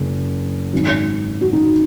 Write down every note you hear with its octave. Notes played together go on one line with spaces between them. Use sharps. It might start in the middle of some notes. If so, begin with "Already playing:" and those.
Already playing: F#1
G#1 G#2 F#3
F#4
D#4